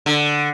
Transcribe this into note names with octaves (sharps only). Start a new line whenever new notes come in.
D3